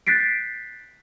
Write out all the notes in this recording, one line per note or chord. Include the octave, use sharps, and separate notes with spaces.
F#6 G6 A6 B6 C7 D7